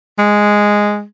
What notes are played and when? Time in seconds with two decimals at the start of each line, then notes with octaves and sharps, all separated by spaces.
0.19 G#3